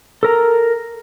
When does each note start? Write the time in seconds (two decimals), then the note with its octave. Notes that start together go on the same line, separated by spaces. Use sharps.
0.23 A4 A#4 A#5